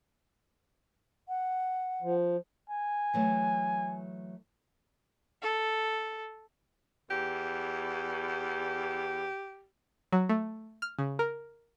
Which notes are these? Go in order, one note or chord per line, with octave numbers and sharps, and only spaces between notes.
F#5
F3
G#5
E3 F#3 A3
A4
E2 G4
F#3
A3
F6
C#3
A#4